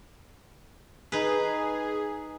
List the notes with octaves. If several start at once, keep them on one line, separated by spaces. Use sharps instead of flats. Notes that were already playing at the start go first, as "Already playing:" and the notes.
D#4 G#4 B4